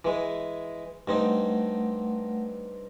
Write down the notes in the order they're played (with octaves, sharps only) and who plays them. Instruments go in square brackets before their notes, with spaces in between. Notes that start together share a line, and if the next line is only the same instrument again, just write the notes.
[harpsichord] E3 G#3
[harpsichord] G2 C4 D#4 [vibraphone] A3 F#5